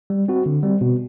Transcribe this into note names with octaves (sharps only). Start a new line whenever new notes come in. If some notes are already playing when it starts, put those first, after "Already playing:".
G3
C4 F#4
D3
G3 C4
B2